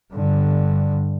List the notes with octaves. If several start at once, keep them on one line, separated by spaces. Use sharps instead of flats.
G2 D3